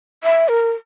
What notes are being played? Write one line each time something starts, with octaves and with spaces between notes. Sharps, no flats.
E5
A#4